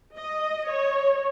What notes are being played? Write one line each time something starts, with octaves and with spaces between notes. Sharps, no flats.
D#5
C#5